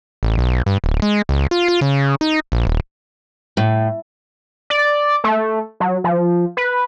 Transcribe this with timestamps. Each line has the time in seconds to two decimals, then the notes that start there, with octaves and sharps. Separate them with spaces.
0.23 A1
0.38 B1
0.66 G2
0.84 D1
1.02 G#3
1.29 C#2
1.51 F4
1.68 F4
1.81 C#3
2.21 D#4
2.52 A#1
2.67 D#1
3.57 A2
4.70 D5
5.24 A3
5.80 F#3
6.04 F3
6.57 B4